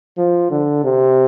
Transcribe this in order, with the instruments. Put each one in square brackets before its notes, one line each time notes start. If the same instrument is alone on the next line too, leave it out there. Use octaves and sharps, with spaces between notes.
[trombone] F3
D3
C3